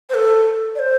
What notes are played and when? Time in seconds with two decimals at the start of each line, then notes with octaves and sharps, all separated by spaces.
0.10 C5
0.14 A4
0.75 D5
0.79 C5